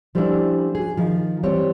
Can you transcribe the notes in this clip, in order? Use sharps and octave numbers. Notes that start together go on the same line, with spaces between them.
F3 G3 A3 C#4 D4 E4
F#4 G#4
D#3 F3
E3 G3 C4 C#5